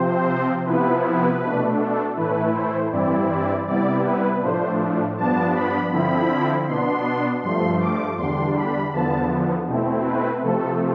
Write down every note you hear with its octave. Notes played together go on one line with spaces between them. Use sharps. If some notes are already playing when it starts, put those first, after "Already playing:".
Already playing: C3 F3 C4 C5
C3 F3 B3 E4 B4
B4
B2 A3 D4
A4
A2 E3 A3 E4 B4
C5
G2 E3 G3 C4 E4 D5
D5
C3 G3 B3 E4 D5
B4
A2 F3 A3 D4 C5
G2 F3 B3 D4 A5
B5
D3 F3 C4 E4 B5
B2 B3 D4 C6
G2 F3 A3 C6
D6
E2 D3 G3 D4 C6
B5
E2 D3 F3 B3 A5
B2 A3 C4 E4
B4
C3 F3 A3 A4